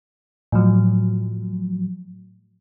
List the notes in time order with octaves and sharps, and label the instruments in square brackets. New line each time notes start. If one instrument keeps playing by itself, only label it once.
[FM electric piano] A2 F3 F#3